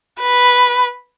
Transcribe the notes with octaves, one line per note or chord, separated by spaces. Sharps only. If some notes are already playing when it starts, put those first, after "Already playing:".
B4